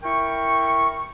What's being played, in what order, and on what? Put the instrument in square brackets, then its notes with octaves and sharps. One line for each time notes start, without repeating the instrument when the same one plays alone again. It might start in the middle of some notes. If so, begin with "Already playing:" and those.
[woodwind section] E4 A#4 G5 C#6